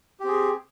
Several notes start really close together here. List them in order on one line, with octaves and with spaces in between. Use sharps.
G4 C4 G#4